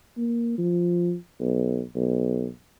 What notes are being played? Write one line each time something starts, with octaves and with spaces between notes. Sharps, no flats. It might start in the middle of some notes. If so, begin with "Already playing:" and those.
A#3
F3
B1
B1